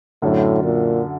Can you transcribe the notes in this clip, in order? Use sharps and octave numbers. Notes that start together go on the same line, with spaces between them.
F#2 A2 D3 F#3
A#2